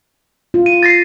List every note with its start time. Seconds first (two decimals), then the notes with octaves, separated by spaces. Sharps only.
0.54 F4
0.66 D#7
0.83 A6 A#6 C7